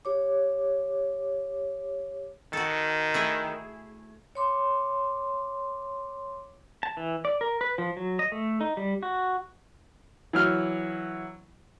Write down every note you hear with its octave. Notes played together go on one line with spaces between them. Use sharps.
G4 C#5 D6
D#3 F#4 A4
A3 E4 G#4
C#5 C6 D6
A5
E3
D5
A#4
B4
F3
F#3
D#5
A3
D#4
G3
F#4
E3 F#3 F6